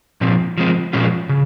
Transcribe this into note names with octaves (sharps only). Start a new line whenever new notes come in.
A#2 F3 C4
F3 G#3 C4
A#2 F3 G#3 C#4 F4
C#3